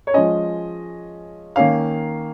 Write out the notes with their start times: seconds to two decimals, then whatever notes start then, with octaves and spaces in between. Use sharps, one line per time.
0.07 C#5
0.14 F3 G#3 C#4 D#5
1.56 D#3 A#3 C#4 F5